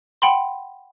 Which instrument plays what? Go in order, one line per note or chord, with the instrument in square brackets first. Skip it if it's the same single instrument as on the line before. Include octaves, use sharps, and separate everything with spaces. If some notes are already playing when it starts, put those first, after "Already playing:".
[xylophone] F#5 G5 B5 C6